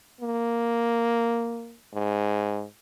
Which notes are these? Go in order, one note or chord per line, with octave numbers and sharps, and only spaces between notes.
A#3
G#2